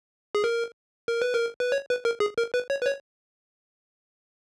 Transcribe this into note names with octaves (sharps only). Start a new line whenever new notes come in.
G#4
A#4
A#4
B4
A#4
B4
C#5
B4
A#4
G#4
A#4
B4
C#5
B4
C#5